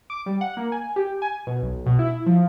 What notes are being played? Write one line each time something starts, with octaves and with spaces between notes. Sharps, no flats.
D6
G3
F#5
A#3
G#5
G4
G#5
B2
B1
B2
E4
F3